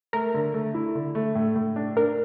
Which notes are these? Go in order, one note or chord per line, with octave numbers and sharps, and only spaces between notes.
A3 A#4
D3
A3
E4
D3
A3
A2
A2
D4
D4 A#4